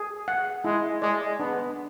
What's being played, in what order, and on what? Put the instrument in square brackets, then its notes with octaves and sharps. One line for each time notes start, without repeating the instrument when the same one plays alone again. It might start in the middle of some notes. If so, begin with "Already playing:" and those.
Already playing: [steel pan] G#4
F#5
[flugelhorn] G#3 [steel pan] E4
[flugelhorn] G#3 [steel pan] D5
[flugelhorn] B3 [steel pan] D4